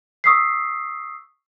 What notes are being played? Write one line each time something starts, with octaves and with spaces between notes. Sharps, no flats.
C#6 D#6 E6 B6 C7